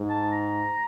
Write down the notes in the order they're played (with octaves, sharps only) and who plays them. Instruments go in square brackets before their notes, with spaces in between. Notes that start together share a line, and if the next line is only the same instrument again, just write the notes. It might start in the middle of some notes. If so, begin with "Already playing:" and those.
Already playing: [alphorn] G#2
[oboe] A5
A#5